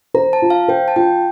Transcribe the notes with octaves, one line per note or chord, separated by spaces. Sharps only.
C5 A#5
A5
F4
F5
C5 G5
A5
F4 G5